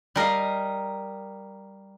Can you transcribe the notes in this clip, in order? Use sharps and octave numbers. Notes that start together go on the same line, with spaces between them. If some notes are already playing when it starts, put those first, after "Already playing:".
G3 A#4 D#5 F5